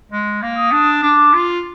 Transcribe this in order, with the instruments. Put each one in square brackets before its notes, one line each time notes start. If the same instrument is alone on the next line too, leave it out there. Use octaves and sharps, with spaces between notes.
[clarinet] G#3
A#3
[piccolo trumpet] D#6
[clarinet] D4
[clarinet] D4 [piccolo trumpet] D6
[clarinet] F4